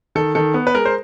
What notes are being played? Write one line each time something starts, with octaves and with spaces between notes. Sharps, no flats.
D#3 A4
D#3 A4
B3
B4
G#3 A#4
C5